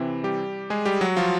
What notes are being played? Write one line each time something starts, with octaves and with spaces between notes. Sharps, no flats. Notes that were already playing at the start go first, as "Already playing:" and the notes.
Already playing: C3 E3 C4 E4
G3 G4
G#3 G#4
G3 G4
F#3 F#4
F3 F4